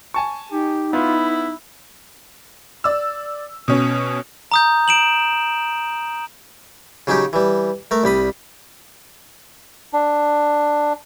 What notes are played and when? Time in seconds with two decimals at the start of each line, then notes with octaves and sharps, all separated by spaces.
0.14 G#5 A5 C#6
0.52 D#4 G4
0.93 B3 E4 F4
1.28 B5
2.84 D5 E6
3.68 B2 C#4
4.52 A#5 D#6 G6
4.88 D7 E7 F#7
7.07 C#3 F#3 C#4 D#4 G4
7.33 E3 G3
7.91 A3 A#4
8.04 C2 G3 B5 D#6
9.93 D4